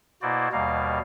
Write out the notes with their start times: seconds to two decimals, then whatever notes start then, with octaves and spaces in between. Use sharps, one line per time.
0.22 B2 A#3 E4 F#4 C5 D5
0.52 D#2 B2 G3 A#3 F5